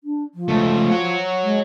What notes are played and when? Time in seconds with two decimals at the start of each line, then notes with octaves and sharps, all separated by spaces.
0.04 D4
0.34 F3
0.48 C#2 A3
0.91 C#5 F#5
1.43 G#3